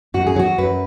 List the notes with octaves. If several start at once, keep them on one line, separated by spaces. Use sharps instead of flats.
F#2 F#4
G#4
F#3 F#4
F#2 B4